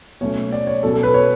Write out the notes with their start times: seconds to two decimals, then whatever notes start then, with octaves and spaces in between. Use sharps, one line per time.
0.21 B2 F#3 A3 C#4 C#5
0.52 D5
0.67 C#5
0.83 B2 F#3 C#4 A4
0.93 A4
1.03 B4
1.14 C#5